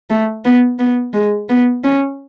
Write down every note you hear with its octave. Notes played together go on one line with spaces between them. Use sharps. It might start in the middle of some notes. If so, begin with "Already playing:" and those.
A3
B3
B3
G#3
B3
C#4